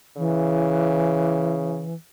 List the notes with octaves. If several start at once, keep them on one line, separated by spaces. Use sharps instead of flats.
C#3 E3